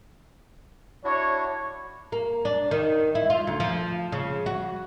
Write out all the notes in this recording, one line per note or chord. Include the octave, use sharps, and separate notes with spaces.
D4 E4 F#4 C#5
A#3
D4
D#3
E4
F4
D2
F3
C#3
F#4